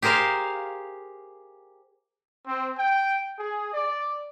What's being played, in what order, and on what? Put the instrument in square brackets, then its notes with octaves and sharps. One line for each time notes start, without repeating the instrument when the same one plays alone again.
[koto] G4 G#4 A#4 C5 F5
[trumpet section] C4
G5
G#4
D5